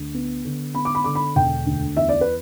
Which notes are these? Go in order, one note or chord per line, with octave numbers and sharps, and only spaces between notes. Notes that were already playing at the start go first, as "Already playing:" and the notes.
Already playing: D2
B3
D3
B3 B5
D6
B5
D3 D6
B5
E1 G5
D2
E2 E5
D5
B4